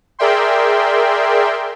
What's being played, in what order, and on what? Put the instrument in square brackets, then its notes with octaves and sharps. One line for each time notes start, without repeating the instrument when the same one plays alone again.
[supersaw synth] G#4 A#4 D5 E5 G5 C6